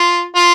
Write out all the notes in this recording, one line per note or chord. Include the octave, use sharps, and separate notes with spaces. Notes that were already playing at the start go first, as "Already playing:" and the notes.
Already playing: F4
F4